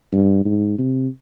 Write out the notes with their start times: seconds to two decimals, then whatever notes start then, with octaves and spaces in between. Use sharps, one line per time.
0.12 G2
0.45 G#2
0.78 C3